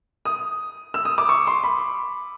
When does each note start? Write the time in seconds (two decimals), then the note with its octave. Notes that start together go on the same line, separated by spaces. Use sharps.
0.25 D#6
0.94 E6
1.05 D#6
1.18 D6
1.29 C#6
1.47 C6
1.64 B5